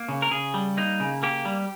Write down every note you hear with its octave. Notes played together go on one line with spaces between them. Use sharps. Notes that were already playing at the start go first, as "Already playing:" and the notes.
Already playing: A#3
C#3
A#4
C#3 G#4
G3
A#3 D#4
C#3
A#3 G4
G3